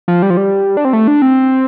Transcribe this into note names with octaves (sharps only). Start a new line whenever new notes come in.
F3
G3
F3
G3
D4
C4
A3
D4
C4